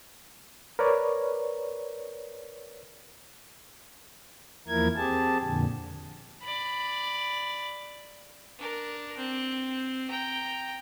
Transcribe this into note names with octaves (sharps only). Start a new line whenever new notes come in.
A#4 B4 C#5 D5
E2 F3 A#3 E4 A#4 G#6
C4 G4 G#4 A5
F2 A#2 D3
D5 B5
D4 A#4
C4
G5 A#5